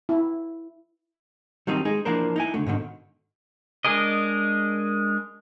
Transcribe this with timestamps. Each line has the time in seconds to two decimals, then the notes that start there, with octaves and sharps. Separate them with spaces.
0.09 E4
1.67 D#3 F#3 G3 C4 D#4
1.85 G#3 D#4 G#4
2.05 E3 F3 A#3 D4 A#4 C5
2.36 D#4 E4 G#5
2.54 C#2 D3 A3
2.67 G#2 B2 D3 D#3
3.85 G#3 D4 G#4 A#4 D#5